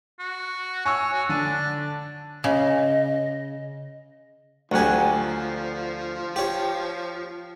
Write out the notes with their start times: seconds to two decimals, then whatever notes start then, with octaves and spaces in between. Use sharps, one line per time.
0.19 F#4
0.86 C#5 G#5 C#6 E6
1.13 F#4
1.29 D3 D4 D#7
2.44 C#3 D#5
4.72 D2 F3 F#3 G4 F#5 G#5
6.36 G4 C#5